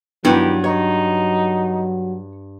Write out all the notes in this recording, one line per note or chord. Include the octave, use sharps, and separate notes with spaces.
G2 D#3 F#3 B3 E4 G4
D#4 C#5